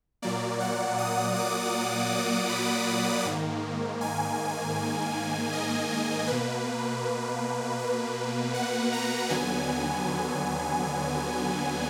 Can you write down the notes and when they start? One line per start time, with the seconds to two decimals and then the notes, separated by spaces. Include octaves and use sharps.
0.22 A#2 F#3 A#3 D5
0.60 F#5
0.98 D#6
1.36 D6
1.74 D6
2.12 D6
2.49 B5
3.25 G#2 D#3 A#3
4.01 G#5
5.52 D#5
6.27 B2 A#3 B4
7.79 B4
8.54 F#5
8.92 A#5
9.30 D#2 D3 F#3 B3 G#5